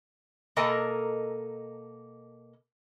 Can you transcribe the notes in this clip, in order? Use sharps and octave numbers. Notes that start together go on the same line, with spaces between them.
B2 A#3 A4 A#4 D#5 G#5